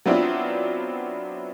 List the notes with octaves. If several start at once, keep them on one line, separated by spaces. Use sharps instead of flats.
F#3 B3 C4 D4 E4 F4